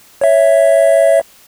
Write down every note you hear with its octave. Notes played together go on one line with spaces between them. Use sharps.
C#5 E5